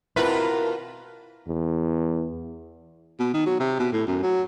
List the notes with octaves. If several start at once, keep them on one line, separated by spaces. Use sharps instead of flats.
B2 A#3 C4 E4 F4 A#4 B4
E2
B2
D#3
F#3
C3
B2
A2
F#2
F#3